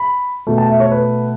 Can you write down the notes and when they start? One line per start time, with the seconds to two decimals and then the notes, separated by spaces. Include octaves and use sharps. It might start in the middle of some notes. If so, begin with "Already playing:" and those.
Already playing: B5
0.47 B2 A3
0.58 A5
0.70 E5
0.80 C#5
0.92 B4